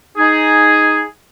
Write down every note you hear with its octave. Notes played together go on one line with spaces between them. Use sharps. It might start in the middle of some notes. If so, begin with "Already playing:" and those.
D#4 G#4